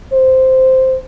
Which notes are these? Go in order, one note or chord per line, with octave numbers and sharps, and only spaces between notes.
C5